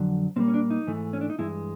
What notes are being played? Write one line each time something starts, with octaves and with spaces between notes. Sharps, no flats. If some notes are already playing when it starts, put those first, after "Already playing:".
Already playing: F2 D3 F#3
A#2 G3 A#3 C4
C#4
D4
D#4
G#2 E3 A3
C#4
D4
D#4
G2 E3 G#3 E4